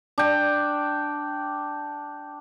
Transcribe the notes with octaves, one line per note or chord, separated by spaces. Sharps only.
D4 G5